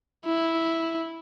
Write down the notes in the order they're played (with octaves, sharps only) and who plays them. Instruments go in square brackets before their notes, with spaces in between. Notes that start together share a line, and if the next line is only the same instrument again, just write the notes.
[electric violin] E4